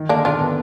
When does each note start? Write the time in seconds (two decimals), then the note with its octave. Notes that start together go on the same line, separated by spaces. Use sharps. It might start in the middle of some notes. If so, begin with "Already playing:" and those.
Already playing: D#3
0.09 D3 A#3 D4
0.25 B2 D4 F4
0.41 B2